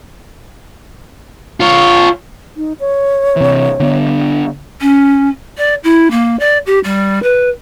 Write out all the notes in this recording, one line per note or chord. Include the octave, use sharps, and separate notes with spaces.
F4 C#5
D#4
C#5
C3 E3
D3 B3 D4
C#4
D5
E4
A#3
D5
G4
G3
B4